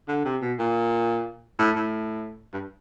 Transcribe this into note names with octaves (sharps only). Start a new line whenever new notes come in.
D3
C3
B2
A#2
A2
A2
G2